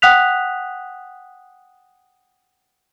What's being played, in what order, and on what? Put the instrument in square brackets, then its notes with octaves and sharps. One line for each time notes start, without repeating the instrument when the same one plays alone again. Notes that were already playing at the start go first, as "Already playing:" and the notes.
[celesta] F#5 G5 D#6 F#6 B6 F7